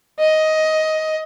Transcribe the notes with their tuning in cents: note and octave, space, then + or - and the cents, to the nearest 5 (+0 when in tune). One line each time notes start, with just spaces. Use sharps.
D#5 +10